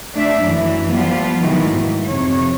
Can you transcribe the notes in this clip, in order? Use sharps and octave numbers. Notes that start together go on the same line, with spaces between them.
A3 D4 E5
F#2 E3
F3 G3 B3 F4
B2 D#3 E3 F#3 G#3 A3
G#2
F2 C3 C#5